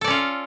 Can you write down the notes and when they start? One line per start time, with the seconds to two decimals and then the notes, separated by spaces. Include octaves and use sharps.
0.01 A4
0.04 D5
0.07 C#4
0.10 F4